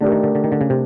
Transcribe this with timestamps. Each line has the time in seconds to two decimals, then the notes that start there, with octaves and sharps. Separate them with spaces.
0.01 D3 A3 D4 G4 A#4
0.12 D#3
0.23 D3
0.35 D3
0.44 D#3
0.52 D3
0.61 C#3
0.70 C3